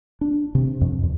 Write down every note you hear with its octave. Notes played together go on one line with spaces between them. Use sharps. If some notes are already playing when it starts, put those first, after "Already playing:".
D4
C3
F2
E2